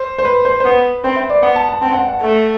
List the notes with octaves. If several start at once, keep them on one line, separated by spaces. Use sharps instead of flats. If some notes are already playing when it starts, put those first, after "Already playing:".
Already playing: C5
C5
B4
C5
C5
B3 B4
C4 C5
E5
D5
B3 F#5
A5
A5
C4 A5
F#5
F#5
A3